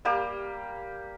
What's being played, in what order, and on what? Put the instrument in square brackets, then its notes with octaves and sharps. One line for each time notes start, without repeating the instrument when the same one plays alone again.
[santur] G3 A#3 G4